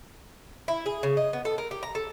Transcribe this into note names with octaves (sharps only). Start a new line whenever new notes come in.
E4
G#4
C#3
D#5
B3
A4
A#4
G4
A#5
A4